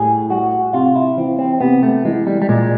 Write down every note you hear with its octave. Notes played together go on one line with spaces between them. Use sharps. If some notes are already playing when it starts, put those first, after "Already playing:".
Already playing: A2 G3 G#4
G3 F#4
C3 F4
E4
E3 C4
C4
C3 B3
A3
E3 G#3
G3
G3
A#2 G#3